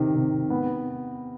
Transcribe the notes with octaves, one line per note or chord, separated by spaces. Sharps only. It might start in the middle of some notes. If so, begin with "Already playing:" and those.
Already playing: C3 D#3
C3
B3